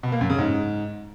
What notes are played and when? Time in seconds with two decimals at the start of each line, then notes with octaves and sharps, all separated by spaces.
0.03 B2
0.12 A#3
0.21 F#2
0.30 C#3
0.38 G#2